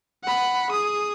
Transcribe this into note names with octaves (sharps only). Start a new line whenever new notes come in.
F#5 B5
G#4 D#6